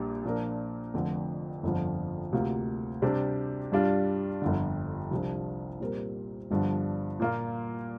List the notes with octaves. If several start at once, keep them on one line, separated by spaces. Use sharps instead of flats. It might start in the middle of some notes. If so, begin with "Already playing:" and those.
Already playing: A#1 A#2 G3 D4
A#2 F3 D4 A#4
F1 F2 D3 F3
G1 F2 D3 F3
D2 C3 A#3 F4
C3 G3 D4 G4 C5
G2 G3 D4 F4
G1 F2 D3
C2 C3 F3 D4
A#2 G3 C4 A#4
G1 G2 D3 F3 D4
A#2 A#3 F4